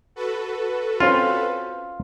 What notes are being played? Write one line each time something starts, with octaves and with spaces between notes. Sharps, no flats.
F#4 A4 B4
C4 C#4 F4 F5